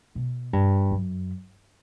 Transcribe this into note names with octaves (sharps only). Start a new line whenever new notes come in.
B2
G2
F#2